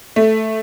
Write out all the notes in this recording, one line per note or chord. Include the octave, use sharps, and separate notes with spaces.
A3